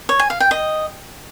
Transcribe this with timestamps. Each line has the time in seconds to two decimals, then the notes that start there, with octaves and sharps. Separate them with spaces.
0.09 C#5
0.19 G#5
0.30 F5
0.40 G5
0.51 D#5